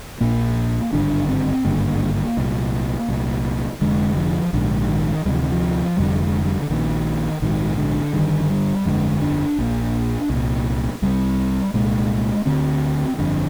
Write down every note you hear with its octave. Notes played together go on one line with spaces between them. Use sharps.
A#1 A#2 A#3
G#1 G2 D3 D4
C4
G#1 G2 D3 A#3
C2 A#2
C2 A#2
F1 F2 D3 G#3
F3
A#1 G#2 D3
D#3
D2 C3 G3
F3
D#3
F3
F1 F2 D3 G3
G#3
G3
D3
A#1 A#2 D#3
A#1 G#2 D#3
D3
G1 G2 D3 D#3
G3
G1 F2 D3 G#3
D4
A#1 A#2
C2 A#2
C2 C3 G3
C2 A#2 G#3
D2 D3 C4
G1 F2 D3